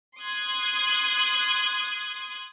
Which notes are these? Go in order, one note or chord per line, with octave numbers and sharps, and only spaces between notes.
C6 D#6 F#6 G#6